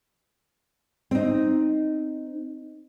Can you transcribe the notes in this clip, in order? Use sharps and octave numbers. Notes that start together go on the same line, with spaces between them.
C4 D#4